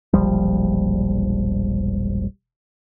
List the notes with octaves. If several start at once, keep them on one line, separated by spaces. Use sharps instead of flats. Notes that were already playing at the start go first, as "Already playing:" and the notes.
E1 A#1 F3 G3